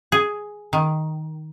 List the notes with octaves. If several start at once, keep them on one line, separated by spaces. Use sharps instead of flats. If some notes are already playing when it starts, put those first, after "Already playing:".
G#4
D#3